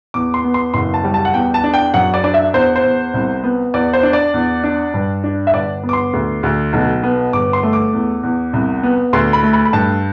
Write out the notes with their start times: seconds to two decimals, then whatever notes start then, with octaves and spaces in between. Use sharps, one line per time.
0.14 E2 D6
0.34 C6
0.44 B3
0.54 C6
0.74 F#1 C6
0.94 A5
1.04 G3
1.14 A5
1.25 F#5
1.34 E2 G5
1.54 A5
1.64 D4
1.74 G5
1.94 F#2 F#5
2.14 D5
2.24 D4 D5
2.34 E5
2.54 E2 C5
2.76 C5
2.84 E2
3.14 C2
3.43 B3
3.74 E2 D5
3.93 C5
4.03 D4
4.13 D5
4.34 E2
4.64 D4
4.94 G2
5.24 D4
5.47 E5
5.53 G1 D5
5.83 B3
5.89 D6
5.93 C6
6.13 D2
6.43 D2
6.73 B1
7.03 B3
7.33 G1 D6
7.53 C6
7.63 A3
7.73 D6
7.93 E2
8.23 E2
8.53 C2
8.83 B3
9.13 D2 C6
9.33 B5
9.43 A3
9.53 B5
9.65 B5
9.73 G2 A5